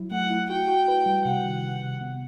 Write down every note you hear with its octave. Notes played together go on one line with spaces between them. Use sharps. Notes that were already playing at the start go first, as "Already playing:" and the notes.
Already playing: F#3 E4
A3 F#5
E4
F#4 G5
F#4
B4
G3
C3 F#5
D#3
C3
C3
B3